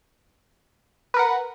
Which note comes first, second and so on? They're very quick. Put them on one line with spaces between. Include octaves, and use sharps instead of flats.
B4 A#4 F#5